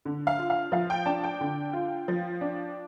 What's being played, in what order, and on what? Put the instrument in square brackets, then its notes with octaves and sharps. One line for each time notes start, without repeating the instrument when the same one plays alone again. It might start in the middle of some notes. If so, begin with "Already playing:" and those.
[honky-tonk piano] D3
F5
F4
F5
F3 F5
G5
D4 A5
G5
D3
F4
F3
D4